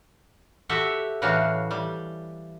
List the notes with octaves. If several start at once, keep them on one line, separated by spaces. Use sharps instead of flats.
F#4 G4 A4 E5 F#5
A2 C#3 E3 D4 F#4 F5
G3